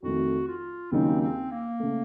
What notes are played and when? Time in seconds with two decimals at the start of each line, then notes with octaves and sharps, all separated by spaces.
0.03 F2 D#3 A3 F#4
0.48 F4
0.92 D#2 C#3 F#3 A#3 C4 D#4
1.21 C4
1.51 A#3
1.80 C#3 A3